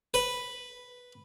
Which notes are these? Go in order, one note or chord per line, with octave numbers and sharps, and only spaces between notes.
B4